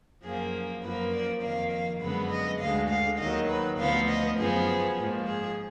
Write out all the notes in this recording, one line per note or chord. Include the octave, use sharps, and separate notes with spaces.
F#2 F3 A#3 G#4
F#2 F3 A#3 B4
D5
F2 D#3 A#3 F5
F5
F#2 D3 G#3 B3 B4
D#5
D2 D3 G#3 F5
F5
D#2 D#3 F#3 D#5
B4
D2 D3 F3 B3 F5
D#5
F#2 F3 B3 G#4
G#2 F3 A#3
G#4